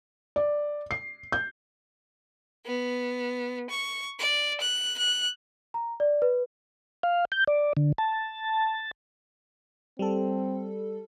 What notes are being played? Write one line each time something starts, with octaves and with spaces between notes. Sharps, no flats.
D5
C7
G6
B3
C#6
D5
F#6
F#6
A#5
D5
B4
F5
G6
D5
D3
A5
G3 C4 A4